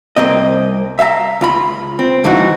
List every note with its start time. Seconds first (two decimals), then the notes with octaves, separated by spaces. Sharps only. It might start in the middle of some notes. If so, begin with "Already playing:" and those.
0.16 C2 A#3 C4 D#5
0.99 E5 F5 G5 A#5
1.41 C#2 F4 B5
1.99 C4
2.24 C#2 G2 E3 D#4 E4 F#4